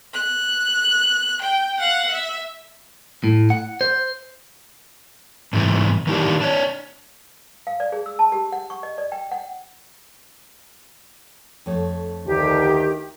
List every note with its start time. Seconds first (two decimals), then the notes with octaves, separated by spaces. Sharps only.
0.14 F#6
1.42 G5
1.80 F5 F#5
2.12 E5
3.24 A2
3.50 F#5
3.81 C5
5.53 G#2 C3 D#3 E3
6.07 D#3 E3 A#3 D4 D#4 G4
6.41 D4 C#5
7.67 F5
7.80 D5
7.92 G#4
8.06 E6
8.19 A5
8.32 G4
8.52 F#5
8.70 C#6
8.83 D#5
8.98 D5
9.12 G5
9.31 F#5
11.66 F2 A3 C#5
12.26 D2 D#3 G4